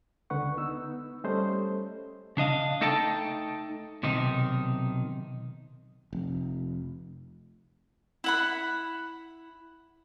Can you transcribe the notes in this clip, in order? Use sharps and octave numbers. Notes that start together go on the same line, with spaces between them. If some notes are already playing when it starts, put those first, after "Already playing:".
C#2 D3 B4 F#5 C#6
B3 D#4 E6
G3 A3 C#4 A4 C5 D#5
C#3 D4 D#5 F5
A3 D#4 A4 D#5 G5 A5
B1 C3 D#3 D#4
F1
E4 F#5 B5